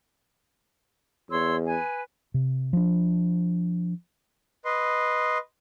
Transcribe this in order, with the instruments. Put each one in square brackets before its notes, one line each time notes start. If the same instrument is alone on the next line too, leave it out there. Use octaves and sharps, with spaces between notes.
[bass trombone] E2 [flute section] C#5 C6 E6
[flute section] B4 G#5
[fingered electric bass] C3
F3 D4
[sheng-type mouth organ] B4 D#5 C6